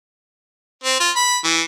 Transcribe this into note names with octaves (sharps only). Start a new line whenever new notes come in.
C4
F4
B5
E3